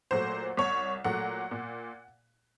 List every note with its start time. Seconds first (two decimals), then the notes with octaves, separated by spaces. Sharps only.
0.11 A#2 F#3 A3 C5
0.57 C2 C#5
1.04 A#2 F#3 A3 F#5
1.51 A#2